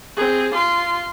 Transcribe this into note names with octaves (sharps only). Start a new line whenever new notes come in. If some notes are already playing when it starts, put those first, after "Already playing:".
C4 G#4
F4 C6